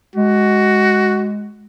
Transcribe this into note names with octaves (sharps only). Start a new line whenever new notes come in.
G#3 F#4